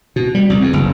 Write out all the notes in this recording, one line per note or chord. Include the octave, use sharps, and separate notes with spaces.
B2
G3
C2
E2
F#1